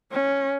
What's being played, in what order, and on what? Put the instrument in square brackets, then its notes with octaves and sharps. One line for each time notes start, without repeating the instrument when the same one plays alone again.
[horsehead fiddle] C#4